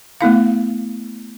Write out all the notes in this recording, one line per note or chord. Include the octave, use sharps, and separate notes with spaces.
A3 B3 E4 F5